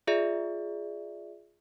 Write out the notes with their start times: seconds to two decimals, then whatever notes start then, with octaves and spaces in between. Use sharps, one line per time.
0.07 F4 G#4 D5 E5